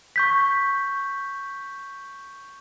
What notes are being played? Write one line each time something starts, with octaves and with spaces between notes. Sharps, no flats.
C#6 G6 B6